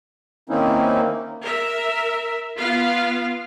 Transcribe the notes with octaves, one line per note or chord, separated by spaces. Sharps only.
D#3 A#3 C4 C#4 D#4 E4
A#4 E5
B3 F4 F5